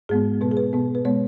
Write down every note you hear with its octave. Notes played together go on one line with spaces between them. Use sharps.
G#2 G#3 B3 G#4
B2 B3 B4
G#4
B4
B2 B3
B4
B2 G#3 B3 C#5